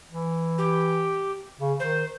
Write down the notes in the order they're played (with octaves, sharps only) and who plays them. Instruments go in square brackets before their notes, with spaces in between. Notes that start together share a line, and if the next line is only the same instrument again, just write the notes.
[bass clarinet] E3
[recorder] G4
[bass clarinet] C#3
[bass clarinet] D#3 [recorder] C5